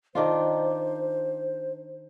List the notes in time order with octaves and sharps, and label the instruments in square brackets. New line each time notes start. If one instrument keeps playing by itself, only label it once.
[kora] D#3 D4 F4 [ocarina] C5